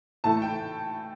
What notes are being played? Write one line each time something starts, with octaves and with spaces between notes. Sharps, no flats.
A2 E3 A3 A5
G5